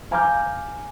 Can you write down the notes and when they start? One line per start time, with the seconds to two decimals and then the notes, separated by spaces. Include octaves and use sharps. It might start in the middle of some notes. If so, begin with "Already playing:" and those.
0.11 F5 G#5 A#5 D6 F6 G6